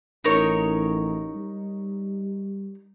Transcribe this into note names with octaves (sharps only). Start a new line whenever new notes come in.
A1 D#4 A#4 C#5
G3